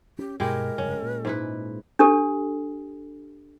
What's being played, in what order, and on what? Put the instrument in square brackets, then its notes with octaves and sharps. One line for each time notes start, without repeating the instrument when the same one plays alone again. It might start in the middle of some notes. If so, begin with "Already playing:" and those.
[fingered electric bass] C#4 [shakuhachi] G4
[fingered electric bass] G2 B2 [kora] G#3 E4 G4 [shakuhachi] A#4
[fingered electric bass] F1 G2 C#3 [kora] C#4
[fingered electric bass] A#2
[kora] G#2 E4 B4
[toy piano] D4 G4 A4